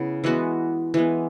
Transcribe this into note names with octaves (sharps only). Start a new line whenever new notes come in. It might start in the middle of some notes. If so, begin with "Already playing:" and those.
Already playing: C#3 B3 E4
E3 G#3 B3 F#4
E3 G#3 B3